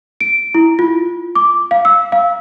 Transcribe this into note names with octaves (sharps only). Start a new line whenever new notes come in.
D7
E4
F4
D6
F5
E6
F5